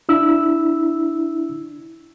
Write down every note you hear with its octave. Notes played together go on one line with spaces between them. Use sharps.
D4 E4 E6